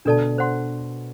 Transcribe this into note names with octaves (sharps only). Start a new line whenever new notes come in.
B2 D3 D4 A4 D5 A5
C5 F#5 C6